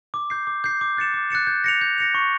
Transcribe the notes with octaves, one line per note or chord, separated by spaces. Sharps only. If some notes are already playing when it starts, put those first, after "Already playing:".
D6
G6 C7
D6
G6 C7
D6
F#6 A6 C#7 E7
D6
F#6 A6 C#7 E7
G6
A#6 C#7 F7
G6
A#6 C#7 F7
C#6